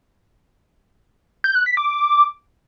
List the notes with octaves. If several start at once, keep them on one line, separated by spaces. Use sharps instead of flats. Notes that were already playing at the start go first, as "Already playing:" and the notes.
G6
F#6
B6
D6